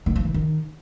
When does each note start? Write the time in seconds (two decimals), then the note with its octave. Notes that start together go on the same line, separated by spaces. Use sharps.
0.06 D#3
0.16 F3
0.25 E3
0.34 D#3